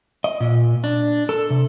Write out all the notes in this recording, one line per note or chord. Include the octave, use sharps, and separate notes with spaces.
D#5
A#2
D4
A4
C3